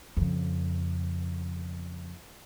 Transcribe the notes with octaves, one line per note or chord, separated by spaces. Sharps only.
F2 C#3